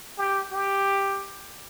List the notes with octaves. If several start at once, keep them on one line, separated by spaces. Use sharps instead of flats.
G4
G4